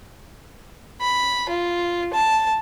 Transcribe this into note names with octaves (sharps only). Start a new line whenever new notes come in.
B5
F4
A5